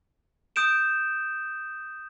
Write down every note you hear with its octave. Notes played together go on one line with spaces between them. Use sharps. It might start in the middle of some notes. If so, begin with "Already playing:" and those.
D#6 G6 D7 E7